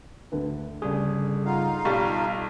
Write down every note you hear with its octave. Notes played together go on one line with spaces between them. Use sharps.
D2 D3 B4
G1 C#3 G3 G#4
D#4 F4 F5 F#5
B1 G3 C#6 F6 A6